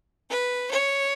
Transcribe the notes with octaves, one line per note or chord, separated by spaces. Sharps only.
B4
C#5